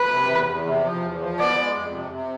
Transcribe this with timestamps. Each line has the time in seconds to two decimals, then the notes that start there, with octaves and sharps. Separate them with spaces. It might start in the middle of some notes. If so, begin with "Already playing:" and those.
Already playing: B4
0.10 C3
0.29 E2
0.47 E2
0.65 C3
0.84 F3
1.02 E2
1.21 F3
1.39 B3 D5
1.57 G#3
1.76 F2
1.93 C3
2.12 C3